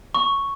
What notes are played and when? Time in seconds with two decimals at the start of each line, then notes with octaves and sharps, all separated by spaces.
0.15 C#6